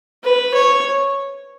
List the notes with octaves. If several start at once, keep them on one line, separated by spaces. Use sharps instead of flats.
B4
C#5